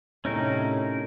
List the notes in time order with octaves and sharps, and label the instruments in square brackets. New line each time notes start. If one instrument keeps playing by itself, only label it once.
[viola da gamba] A2 C3 [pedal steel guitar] C#4 D#4 A#4